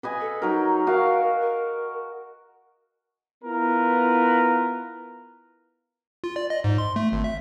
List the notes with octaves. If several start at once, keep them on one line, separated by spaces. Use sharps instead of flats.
B4 D#5 G#5
A4
F#3 D#4 A#4
F#4 A#4 F5
A#4
B3 E4 F4 A#4 B4
F4
D5
D#5
G#2
C6
A3
G#1
E5